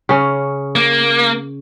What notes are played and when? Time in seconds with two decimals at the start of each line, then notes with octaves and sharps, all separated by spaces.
0.09 C#3 C#4
0.76 A#3